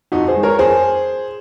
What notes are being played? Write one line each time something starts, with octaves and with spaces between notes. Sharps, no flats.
F2 D#4 F#4
G#4 C5
D#3 G#3
A#4 C#5
F2 G#4 C5